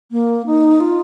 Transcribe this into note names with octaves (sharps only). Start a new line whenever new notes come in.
A#3
D#4
F4